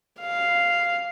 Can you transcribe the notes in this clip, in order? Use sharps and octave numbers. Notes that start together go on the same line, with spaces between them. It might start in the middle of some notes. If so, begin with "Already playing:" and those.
F5